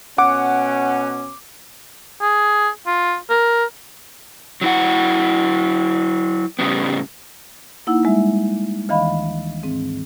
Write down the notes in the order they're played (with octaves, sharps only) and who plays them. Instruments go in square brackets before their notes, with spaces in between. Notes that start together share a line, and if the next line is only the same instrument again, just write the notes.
[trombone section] B2 C#4 [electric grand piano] F#5 D6
[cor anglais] G#4
F4
A#4
[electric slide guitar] F#3 E4 F#5
A2 C#3 G3 B3
[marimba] A#3 D#4 E4 F#5 E6
G3 G#3 E5
D2 D#3 E3 D#5 F5 B5
G#2 C4